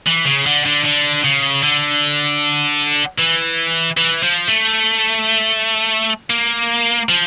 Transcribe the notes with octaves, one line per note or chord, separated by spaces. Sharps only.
E3
C#3
D3
D3
D3
C#3
D3
E3
E3
F3
A3
A#3
F3